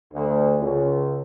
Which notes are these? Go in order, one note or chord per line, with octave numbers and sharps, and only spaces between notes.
D2
C#2